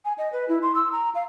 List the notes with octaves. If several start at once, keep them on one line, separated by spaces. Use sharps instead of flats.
G#5
D#5
B4
E4
C6
E6
A#5
F5